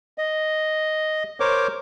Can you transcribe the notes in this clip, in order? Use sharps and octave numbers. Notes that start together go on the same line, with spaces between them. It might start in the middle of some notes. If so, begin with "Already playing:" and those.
D#5
A#4 C5 C#5 D6